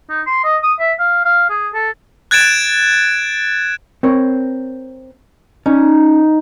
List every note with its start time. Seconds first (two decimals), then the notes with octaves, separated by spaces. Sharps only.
0.10 D#4
0.27 C6
0.44 D#5
0.63 D#6
0.80 E5
0.99 F5
1.25 F5
1.50 G#4
1.74 A4
2.31 F#6 G#6 A6 D7 E7
4.03 C4 A#4 C#5
5.66 C#4 D#4